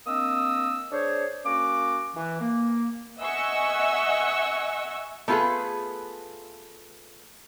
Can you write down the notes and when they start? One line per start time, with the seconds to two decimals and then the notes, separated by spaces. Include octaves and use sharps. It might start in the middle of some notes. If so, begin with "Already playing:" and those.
0.07 A#3 C4 D4 D#5 D#6 E6
0.92 D4 G#4 C5 C#5
1.46 A#3 C#4 F#4 D6
2.16 E3
2.41 A#3
3.19 D#5 E5 F#5 G#5 C#6 E6
5.28 A3 B3 F4 G#4 A4 B4